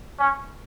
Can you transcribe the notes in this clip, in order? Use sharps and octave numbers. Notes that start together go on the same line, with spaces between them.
C#4